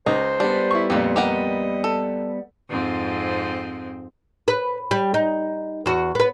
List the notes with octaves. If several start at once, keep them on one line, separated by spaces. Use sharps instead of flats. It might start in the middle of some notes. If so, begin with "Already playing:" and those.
C#2 D#4 C5
G3 B3 D4
E4 C#6
F2 A#2 D#3 G4
G4 A#4 D#5 F#5
A4
F2 G#2 C4
B4
G3
D#4
E2 F#4
B3 B4